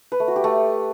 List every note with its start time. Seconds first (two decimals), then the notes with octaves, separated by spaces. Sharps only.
0.12 B4
0.20 A3
0.28 F#4
0.36 G4
0.44 A3